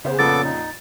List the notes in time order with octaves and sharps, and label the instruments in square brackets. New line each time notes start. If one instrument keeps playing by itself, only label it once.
[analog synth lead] C#3 [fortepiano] B3 C5
[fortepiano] A#1 F2 A#2 [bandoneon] B3 A4 D6 [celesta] A6
[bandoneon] D#4